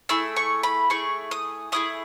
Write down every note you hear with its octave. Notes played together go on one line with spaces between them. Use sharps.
A3 E4 G#4 E6
C#6
B5
A3 E4 G#4 C#6
D#6
A3 E4 G#4 D#6